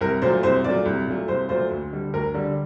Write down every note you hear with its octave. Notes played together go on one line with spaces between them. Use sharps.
C2 A#4
A#2 F#3 A3 C5
C2 C5
A#2 F#3 A3 D5
C2
A#2 F#3 A3
C2 C5
A#2 F#3 A3 C5
D2
D3 G3
D2 A#4
D3 G3